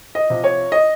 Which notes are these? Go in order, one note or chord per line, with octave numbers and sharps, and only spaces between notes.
D#5
C3 F3
C#5
D#5